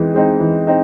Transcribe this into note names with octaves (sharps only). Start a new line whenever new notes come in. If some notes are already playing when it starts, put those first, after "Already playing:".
Already playing: E3 G#3 C4 D#4
G#3 C4 D#4
E3
C4 D#4